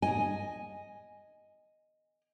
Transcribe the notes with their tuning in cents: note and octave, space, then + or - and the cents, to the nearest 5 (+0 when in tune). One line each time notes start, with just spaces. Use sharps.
D#5 +0 G#5 +0